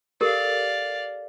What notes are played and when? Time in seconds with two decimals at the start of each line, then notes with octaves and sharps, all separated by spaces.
0.21 G4 A4 A#4 D5 F5